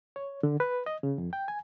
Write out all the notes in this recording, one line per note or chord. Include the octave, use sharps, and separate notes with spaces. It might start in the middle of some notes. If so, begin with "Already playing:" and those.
C#5
D3
B4
D#5
C#3
F2
G5
G#5